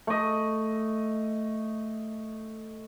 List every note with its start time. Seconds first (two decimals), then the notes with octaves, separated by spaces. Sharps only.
0.07 A3 D#5